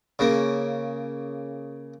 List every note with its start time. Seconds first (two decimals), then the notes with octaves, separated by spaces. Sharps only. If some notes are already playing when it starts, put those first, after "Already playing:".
0.19 C#3 A#3